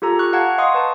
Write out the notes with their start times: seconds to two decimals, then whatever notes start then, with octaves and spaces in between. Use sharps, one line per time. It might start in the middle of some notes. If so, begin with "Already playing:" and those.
0.02 F4 G4 A4 A#5
0.19 C#6 F#6
0.33 F5 F#5 A5 A#5 G#6
0.58 D#5 F5 C6 C#6 D#6
0.75 B4 A5